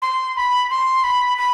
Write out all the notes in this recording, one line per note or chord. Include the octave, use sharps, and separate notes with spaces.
C6
B5
C6
B5
B5